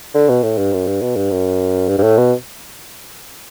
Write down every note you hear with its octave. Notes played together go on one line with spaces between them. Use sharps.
D3
B2
A2
G2
F#2
G2
B2
G2
F#2
G2
G2
A2
B2